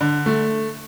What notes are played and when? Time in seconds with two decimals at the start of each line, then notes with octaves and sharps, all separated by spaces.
0.01 D3
0.26 A3